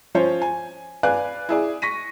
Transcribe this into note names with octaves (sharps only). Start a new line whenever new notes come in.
F3 C#4 C5 C#5
G#5
B4 D5 F5 G#5 F#6
E4 G#4 D5
C#6 A#6 B6 D#7